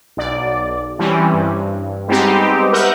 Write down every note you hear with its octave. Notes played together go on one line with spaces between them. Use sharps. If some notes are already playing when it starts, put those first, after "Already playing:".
B1 D5
E3 G3 C4 C#4
G2
G3 G#3 B3 C4 D#4 G4
A#4 B4 E5 F#5 G6 A#6